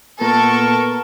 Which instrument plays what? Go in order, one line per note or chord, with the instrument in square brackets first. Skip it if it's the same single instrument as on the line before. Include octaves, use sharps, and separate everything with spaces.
[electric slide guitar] A#2 [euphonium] B3 [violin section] A4 C#6 [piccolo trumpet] A#4